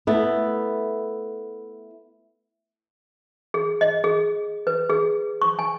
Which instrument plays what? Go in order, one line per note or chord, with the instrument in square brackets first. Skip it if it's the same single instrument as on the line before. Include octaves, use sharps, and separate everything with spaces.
[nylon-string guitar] A3 B3 E4
[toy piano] G#4
D#5
G#4
B4
G#4
C#6
G#5